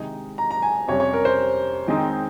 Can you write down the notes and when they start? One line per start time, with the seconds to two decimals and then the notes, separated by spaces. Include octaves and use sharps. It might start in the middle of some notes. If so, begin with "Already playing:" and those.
Already playing: C3 D#3 G#3 D#4
0.38 A#5
0.51 A#5
0.62 G#5
0.87 F2 C3 G3 C#4 C#5
1.00 C#5
1.13 A#4
1.25 C5
1.88 D#3 G#3 C4 D#4